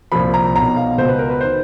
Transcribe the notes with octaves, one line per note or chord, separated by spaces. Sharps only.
C2 A#2 F3 B5
A#5
B1 B2 A#5
F5
C#2 B2 C5
B4
A#4
B4
D#3 C5